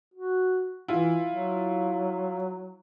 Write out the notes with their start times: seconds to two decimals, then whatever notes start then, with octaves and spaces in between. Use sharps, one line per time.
0.14 F#4
0.88 E3 E4 F4
1.28 F#3